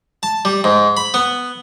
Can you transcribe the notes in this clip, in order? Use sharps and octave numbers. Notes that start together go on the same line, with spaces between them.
A5
G3
G#2
B5
B3